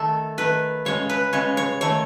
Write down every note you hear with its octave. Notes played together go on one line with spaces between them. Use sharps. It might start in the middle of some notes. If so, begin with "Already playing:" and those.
Already playing: D#3 A3 A4
D#3 A3 B4
C#3 G#3 C#5
B4
C#3 G#3 C#5
C#5
D#3 A3 C#5